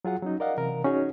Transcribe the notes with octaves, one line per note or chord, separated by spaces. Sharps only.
F#3 F4 G#4 F#5
F#3 C#4 D#4
A#4 D5 D#5 F5 F#5
C3 E3 A#4
C#4 D#4 F#4 G#4 C#5